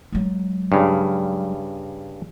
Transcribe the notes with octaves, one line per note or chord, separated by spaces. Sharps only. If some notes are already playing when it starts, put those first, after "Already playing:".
F#3 G#3
G2 C#3